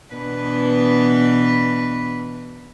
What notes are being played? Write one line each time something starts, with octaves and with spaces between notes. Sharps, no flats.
B2 E3 B3 D4 B4